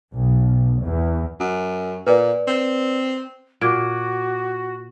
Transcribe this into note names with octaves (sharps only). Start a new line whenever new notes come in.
B1
E2
F#2
A#2 B4 D5
C4
A#2 F#4 D6 G#6 D7